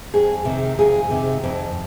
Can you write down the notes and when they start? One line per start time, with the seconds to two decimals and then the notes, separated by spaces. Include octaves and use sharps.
0.14 F2 G#4
0.45 C3 D#3
0.79 F2 G#4
1.10 C3 D#3
1.44 F2